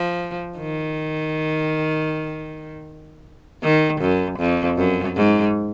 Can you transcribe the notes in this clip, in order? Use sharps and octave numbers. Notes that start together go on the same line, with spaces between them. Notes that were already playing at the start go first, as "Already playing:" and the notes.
Already playing: F3
D#3
D#3
F#2
F2
F#2
G#2